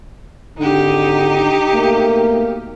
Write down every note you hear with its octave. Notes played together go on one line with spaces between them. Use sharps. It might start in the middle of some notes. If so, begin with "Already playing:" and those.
G#1 D3 D#4 G4
B2 A3 A#3